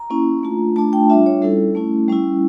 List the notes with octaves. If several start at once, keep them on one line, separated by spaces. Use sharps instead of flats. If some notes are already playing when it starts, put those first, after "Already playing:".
Already playing: A#5
A#3 C#4 E4
A3 D4 F4
A3 D4 F4 A5
G5
G3 D4 F4 E5
C#5
G3 C#4 E4 A4
A3 C#4 E4
G3 C#4 E4